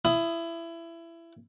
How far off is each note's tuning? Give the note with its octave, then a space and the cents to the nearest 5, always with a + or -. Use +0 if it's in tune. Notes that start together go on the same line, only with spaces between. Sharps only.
E4 +20 D#6 +5